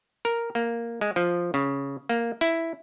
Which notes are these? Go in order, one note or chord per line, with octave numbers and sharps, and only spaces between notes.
A#4
A#3
G#3
F3
C#3
A#3
E4